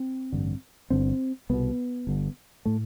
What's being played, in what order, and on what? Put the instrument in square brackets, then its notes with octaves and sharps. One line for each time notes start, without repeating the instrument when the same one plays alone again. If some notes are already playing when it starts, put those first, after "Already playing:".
Already playing: [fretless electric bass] C4
A1 G2 D3
G1 G2 D3 C4
C2 B2 B3
G1 G2 D3
A2 A3